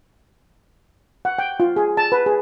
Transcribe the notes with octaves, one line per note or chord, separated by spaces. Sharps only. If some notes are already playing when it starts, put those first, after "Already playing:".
F#5
G5
F4
G#4
A5
B4
G#4